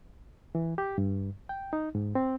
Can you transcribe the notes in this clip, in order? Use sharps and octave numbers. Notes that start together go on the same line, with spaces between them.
E3
G4
G2
G5
D#4
G#2
C4